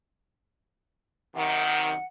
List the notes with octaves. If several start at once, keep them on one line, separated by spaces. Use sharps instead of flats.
F#2 C3 D#3 F#5